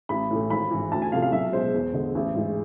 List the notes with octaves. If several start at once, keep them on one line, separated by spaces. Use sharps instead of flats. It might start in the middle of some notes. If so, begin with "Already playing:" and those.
A1 B5
A2 E3 A3
G#1 B5
G#2 E3
D2 A5
G#5
C3 F3 A3 F5
F5
B1 E5
B2 G#3 C5
E2
D3 G#3
A1
G#2 E3 G#3